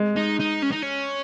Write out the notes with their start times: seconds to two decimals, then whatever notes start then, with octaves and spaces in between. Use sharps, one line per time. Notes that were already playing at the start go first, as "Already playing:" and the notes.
Already playing: G#3
0.16 D#4
0.39 D#4
0.62 C#4
0.72 D#4
0.82 C#4